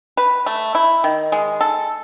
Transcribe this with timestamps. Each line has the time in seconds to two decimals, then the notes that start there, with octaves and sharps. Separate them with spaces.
0.17 B4
0.46 A3
0.75 E4
1.04 D#3
1.32 G#3
1.61 A4